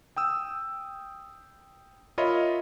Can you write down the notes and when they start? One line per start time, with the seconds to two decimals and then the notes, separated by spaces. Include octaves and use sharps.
0.16 G5 D#6 E6
2.18 F4 A#4 C#5 D#5 E5 B5